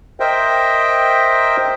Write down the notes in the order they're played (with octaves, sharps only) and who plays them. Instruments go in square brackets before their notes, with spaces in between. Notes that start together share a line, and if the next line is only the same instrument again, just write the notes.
[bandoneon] A#4 C5 D#5 E5 G5